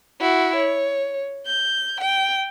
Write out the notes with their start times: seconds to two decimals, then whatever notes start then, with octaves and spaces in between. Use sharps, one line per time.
0.20 E4 F#4
0.56 C#5
1.46 G6
2.01 G5